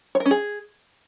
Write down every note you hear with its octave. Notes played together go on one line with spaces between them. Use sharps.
C#5
A#4
C#4
G#4